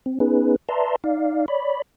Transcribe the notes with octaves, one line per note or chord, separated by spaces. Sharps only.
C4
B3 C#4 D#4 G#4 B4
B4 D5 E5 A5 A#5 C6
D#4 D5 F5
C#5 D5 B5